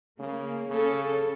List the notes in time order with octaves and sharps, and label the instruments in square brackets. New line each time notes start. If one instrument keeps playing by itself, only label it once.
[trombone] C#3 [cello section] A#3
[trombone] C#3 [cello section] C#4 A4